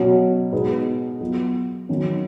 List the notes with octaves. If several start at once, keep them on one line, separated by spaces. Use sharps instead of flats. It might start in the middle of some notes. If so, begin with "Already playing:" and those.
Already playing: B2 F#3 C#4
B2 G#3 D#4 G#4 B4
F#3 B3 F4
D#3 F#3 C#4